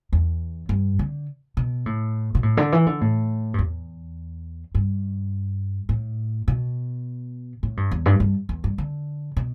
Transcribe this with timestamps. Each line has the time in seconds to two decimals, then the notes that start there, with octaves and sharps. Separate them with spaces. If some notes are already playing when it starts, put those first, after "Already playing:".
0.13 E2
0.69 G2
0.99 D3
1.57 B2
1.86 A2
2.35 B2
2.43 A2
2.57 D3
2.72 E3
2.86 D3
3.01 A2
3.54 G2
3.59 E2
4.75 G2
5.89 A2
6.48 B2
7.63 A2
7.77 G2
7.91 E2
8.06 G2
8.20 G2
8.49 E2
8.64 G2
8.78 D3
9.37 B2